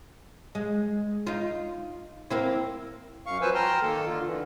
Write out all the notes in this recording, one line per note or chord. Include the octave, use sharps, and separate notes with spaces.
G#3
D#4 F4
A#3 C4 E4
F#2 F5 C#6
F3 F#3 B4 C5 G#5 E6
G5 A5 A#5 C6 F6
D#3 A#3 A4
D3 F4
D3 E3